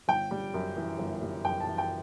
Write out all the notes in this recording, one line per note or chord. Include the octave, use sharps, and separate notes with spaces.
G1 G5
G3
F#2
E3
G1
G3
F#2 G5
A5
E3
G5